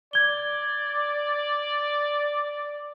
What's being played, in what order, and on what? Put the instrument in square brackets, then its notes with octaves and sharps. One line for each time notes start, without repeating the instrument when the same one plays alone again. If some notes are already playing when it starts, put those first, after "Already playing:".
[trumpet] D5 [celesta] G#6 G7